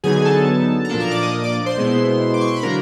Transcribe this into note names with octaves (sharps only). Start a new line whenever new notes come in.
D3 F#3 B3 D#4 G#4 G#5
A4 A5
A#5
A#2 F3 A#3 D4 A4 A5
A#4 A#5
D5 D6
D#5 D#6
D5 D6
C5 C6
B2 G#3 B3 E4
D6
C#6
C6
B5
D3 F#3 A#3 D4 A#4 A#5